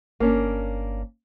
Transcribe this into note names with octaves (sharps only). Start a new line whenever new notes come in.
G1 A#3 C#4 D4